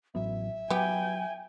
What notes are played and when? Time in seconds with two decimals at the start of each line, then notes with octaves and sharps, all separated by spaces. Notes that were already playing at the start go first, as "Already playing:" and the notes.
0.15 A1 F#3 B3 E5
0.70 F#3 B3 G4 G5 G#5